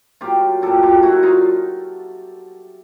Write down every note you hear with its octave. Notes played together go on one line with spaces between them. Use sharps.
A#2 F#3 F4 G4
A#2 F#3 G4 A4
F4 G4
A#2 F#3 E4 F#4
D#4 F4